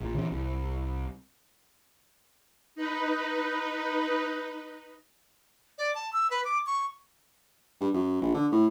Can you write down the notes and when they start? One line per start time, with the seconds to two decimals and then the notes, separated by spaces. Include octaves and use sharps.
0.01 A#1 A#2
0.15 C#3 E3 C4
0.31 C2
2.75 D#4 B4
5.78 D5
5.95 A5
6.13 E6
6.30 B4
6.45 D6
6.66 C#6
7.81 G2
7.94 F#2
8.22 A#1
8.35 D3
8.52 A2